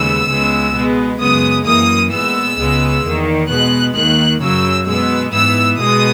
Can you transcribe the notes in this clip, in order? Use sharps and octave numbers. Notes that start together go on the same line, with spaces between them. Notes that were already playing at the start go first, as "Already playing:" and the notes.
Already playing: D#2 C#3 G#3 B3 E6
C#2 C#3 G#3 B3
B2 G#3 B3
F#2 C#3 G#3 B3 D#6
F#2 E3 A#3 D#6
A#2 G#3 B3 E6
C#2 C#3 G#3 B3
E2 D#3 A#3
B2 G#3 B3 F#6
D#2 D#3 A#3 F#6
F#2 C#3 F#3 E6
B2 G#3 B3 E6
G#2 E3 B3 E6
B2 G#3 B3 D#6